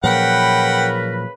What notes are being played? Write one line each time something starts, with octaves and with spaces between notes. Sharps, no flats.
A#2 C#3 F3 F#3 A#4 B4 F#5 G5